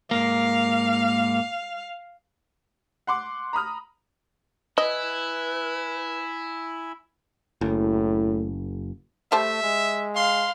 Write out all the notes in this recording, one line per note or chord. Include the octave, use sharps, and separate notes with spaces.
G#2 A#3 F5
F#5 C6 D6
A#5 B5 D#6 F6
E4 B4 D#5 G#5 B5 E6
F#1 A2
G3 A3 C5 E5 A5
G#3
F5 C6